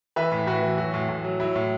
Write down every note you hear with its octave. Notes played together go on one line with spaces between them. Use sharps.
E3 B4 E5
A2
A2 F#4 B4
E3
F#3 F#4
A2
A2
F#3
F#3 E4
A2